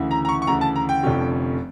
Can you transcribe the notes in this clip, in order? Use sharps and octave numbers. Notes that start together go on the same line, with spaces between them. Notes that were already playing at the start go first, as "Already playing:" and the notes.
Already playing: D2 C#3 E3
A#5
A#5
C#6
C#6
D2 C#3 E3 A#5
A5
A#5
G5
F1 F2 D3 F3 C#4